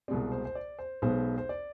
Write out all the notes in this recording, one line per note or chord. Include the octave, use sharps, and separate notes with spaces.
C2 B2 G#3 C4 D5
C5
C5
D5
C5
B1 B2 G#3 B3 C5
C5
D5